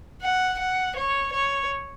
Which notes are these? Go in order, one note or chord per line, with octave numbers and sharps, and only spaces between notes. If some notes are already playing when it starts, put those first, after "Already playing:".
F#5
F#5
C#5
C#5